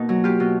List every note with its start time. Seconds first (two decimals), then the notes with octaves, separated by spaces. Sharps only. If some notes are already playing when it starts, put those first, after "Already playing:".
Already playing: B2 A#3 D#4
0.09 F#3
0.24 F4 G4
0.40 B2